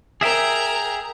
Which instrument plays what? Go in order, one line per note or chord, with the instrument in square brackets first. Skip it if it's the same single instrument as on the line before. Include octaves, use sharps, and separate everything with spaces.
[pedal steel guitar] G#4 E5 G5 [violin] A#4 A#5